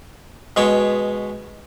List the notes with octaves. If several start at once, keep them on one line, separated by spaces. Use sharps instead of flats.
B2 G#3 C#5